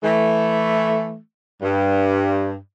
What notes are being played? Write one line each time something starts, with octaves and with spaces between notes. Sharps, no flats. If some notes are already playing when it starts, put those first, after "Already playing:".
E3 A3
G2